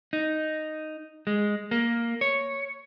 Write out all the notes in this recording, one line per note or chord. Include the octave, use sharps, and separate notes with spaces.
D#4
G#3
A#3
C#5